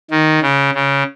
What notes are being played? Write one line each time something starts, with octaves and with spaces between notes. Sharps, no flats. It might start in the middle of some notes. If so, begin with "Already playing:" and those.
D#3
C#3
C#3